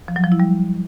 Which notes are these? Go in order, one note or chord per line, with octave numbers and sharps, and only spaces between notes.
F3
F#3
F3
E4
G3